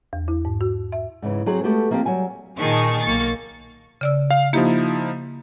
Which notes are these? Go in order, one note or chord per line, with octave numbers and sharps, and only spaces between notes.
E2
E4
G#2
F#4
E5
G#2 C#3 E3
F#3 C4 G#4 C5
G#3 A3 B3 F#4 G4 A4
F3 A#3 C4 F4 G4
F#3 G3 G#5
A#2 D#3 D#4 G#4 A5 C#6
B1 A#3 C#6 A6
C#3 D5 E6
F5
F3 A#3 D#4 E4 G4